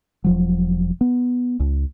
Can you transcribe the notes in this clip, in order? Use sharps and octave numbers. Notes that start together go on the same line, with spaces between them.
E1 F3 F#3
B3
C#2